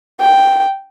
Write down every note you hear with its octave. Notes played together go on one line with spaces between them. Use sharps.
G5